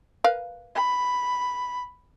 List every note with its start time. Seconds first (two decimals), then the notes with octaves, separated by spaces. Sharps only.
0.24 A#4 B4 F5
0.75 B5